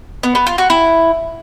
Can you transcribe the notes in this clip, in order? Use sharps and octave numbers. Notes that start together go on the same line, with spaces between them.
B3
B3
F4
F#4
E4